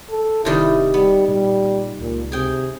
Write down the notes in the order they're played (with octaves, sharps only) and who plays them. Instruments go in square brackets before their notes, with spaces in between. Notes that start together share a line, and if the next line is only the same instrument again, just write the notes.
[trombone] A4
[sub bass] D1 [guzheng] C3 D#3 G3 [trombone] E4
[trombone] G3 [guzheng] B3
[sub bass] A#2 [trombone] G3
[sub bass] C#2 [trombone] A#2
[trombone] C3 [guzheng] G#4 G5